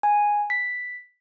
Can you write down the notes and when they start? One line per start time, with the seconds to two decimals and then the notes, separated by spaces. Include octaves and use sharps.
0.03 G#5
0.50 B6